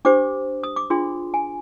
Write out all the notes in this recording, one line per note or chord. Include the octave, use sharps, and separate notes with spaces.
D4 G4 C5 D6
D#6
D6
D4 F4 G#4 C6
G#5